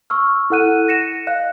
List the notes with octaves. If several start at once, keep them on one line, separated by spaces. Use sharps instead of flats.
C#6 E6 F6
E4 A4 F#5 F#6 D#7
A#6 C#7 E7
D#5 F5 F#6